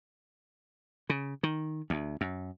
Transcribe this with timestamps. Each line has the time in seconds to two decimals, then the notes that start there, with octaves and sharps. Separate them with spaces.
1.10 C#3
1.43 D#3
1.90 D2
2.21 F#2